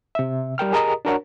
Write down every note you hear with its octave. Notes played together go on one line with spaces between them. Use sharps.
C3 E5
G3 A#4 G5 F6
G4 G#4 A#4 D#5 A#5 D#6
D4 F#4 A#4 C#5 F#5